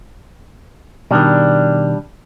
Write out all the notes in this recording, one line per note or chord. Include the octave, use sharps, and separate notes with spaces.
B2 D#3 G3 D4